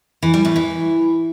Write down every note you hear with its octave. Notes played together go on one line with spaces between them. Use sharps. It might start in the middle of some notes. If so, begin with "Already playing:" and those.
E3
G3
A2
E3